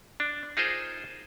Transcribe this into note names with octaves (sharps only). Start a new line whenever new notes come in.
D4
D#4 F4 G#4 A#4 C5 D#5